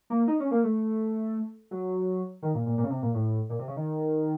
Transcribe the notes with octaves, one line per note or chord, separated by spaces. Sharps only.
A#3
D#4
C#4
A#3
A3
F#3
D#3
A#2
A#2
A#2
C#3
C3
A#2
A2
A#2
C3
C#3
D#3